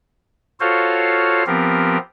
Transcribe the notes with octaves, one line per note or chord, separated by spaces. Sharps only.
F4 F#4 A4 C5 C#5 F5
F3 B3 C4 G4 A#4